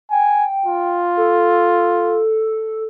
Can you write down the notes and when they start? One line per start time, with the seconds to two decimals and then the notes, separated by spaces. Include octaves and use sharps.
0.11 G5 G#5
0.66 F4
1.17 A4